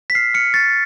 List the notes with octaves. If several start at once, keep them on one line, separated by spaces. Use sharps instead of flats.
B6
F6 C7
F6 C#7
C#6 A6